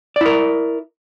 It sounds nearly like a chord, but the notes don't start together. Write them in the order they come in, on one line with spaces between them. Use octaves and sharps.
D5 E4 A#4